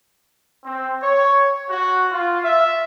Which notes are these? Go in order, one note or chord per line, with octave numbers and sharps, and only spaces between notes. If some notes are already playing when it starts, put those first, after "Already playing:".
C4
C#5
F#4
F4
E5